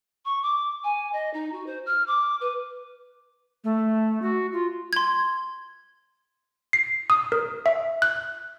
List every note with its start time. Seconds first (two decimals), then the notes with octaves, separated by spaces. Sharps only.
0.25 C#6
0.42 D6
0.83 G#5
1.13 D#5
1.33 D#4
1.52 F#4
1.66 C5
1.86 F6
2.07 D6
2.40 B4
3.64 A3
4.22 F#4
4.53 F4
4.93 C6 G#6
6.73 C7
7.10 D#6
7.32 A#4
7.66 E5
8.02 F#6